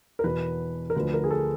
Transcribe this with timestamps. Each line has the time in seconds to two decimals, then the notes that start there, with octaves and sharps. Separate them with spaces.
0.19 A#4
0.24 E2 B2 B4
0.90 A#4
0.95 D2 D3 F3 B4
1.14 A#4
1.24 G#4
1.31 A4